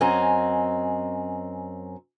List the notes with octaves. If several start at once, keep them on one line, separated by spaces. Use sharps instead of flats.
F#2 C4 C#4 D#5 G#5 A#5